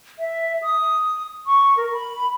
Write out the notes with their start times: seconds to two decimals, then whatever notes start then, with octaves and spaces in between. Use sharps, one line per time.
0.19 E5
0.63 D#6
1.47 C#6
1.77 A#4
1.93 B5